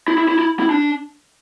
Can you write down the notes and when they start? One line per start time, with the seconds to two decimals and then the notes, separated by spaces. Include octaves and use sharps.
0.08 E4
0.18 E4
0.29 E4
0.39 E4
0.60 E4
0.71 D4